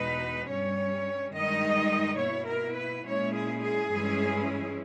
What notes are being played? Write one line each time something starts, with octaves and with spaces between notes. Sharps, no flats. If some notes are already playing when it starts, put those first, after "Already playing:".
Already playing: E2 B2 G#3 D#4 B4
G2 G3 C#4 C#5
G2 D#3 G#3 D#4 D#5
B2 A#3 E4 C#5
A#4
B4
A#2 G#3 C#4 E4 C#5
G#4
G#4
G2 E3 G#3 C#4 E4